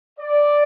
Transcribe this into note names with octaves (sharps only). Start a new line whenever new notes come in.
D5